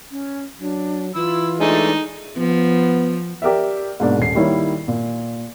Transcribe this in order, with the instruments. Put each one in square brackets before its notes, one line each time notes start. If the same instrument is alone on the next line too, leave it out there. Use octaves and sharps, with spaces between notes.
[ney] C#4
[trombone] F#3 [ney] D4
[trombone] E3 [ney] F4 [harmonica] B5 E6
[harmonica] G#3 A3 D4 [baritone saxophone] D#4
[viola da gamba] F3 [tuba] B3
[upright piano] G4 A#4 D5 E5
G#2 B2 A#3 D4
D#1 C7
D#3 G3 A#3 E4 C#5
A#2